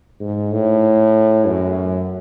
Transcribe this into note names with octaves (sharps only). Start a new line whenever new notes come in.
G#2
A2
F#2